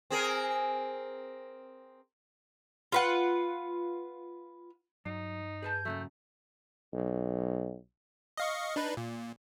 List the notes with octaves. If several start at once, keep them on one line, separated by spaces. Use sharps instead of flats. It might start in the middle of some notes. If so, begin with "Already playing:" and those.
C4 G#4 A#4
F4 B4 F#5
G2 F#3 D#4
G#4 B4 A5 G6
F#2 C#3 F#3 A3
B1
D#5 F5 C#6
D4 D#4 B4
A#2